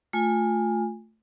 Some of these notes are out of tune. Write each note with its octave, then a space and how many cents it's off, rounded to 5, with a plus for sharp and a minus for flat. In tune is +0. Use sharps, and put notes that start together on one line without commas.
A3 +0 F4 +20 G#5 -15